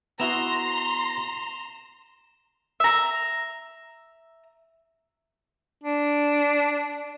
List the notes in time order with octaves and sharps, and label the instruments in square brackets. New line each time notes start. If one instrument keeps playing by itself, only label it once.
[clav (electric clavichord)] B3 E4 F#4 [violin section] A#5 C6 [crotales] E7 F7 G7
[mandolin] E5 A#5
[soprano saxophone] D4